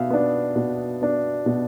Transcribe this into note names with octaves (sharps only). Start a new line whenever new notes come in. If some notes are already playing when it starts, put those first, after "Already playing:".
Already playing: B2 E5 F5
B3 D4
B2
B3 D4
B2